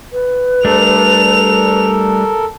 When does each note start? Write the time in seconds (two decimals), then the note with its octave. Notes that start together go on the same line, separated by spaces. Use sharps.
0.12 B4
0.65 G3 A3 D4 A4 A#4 F7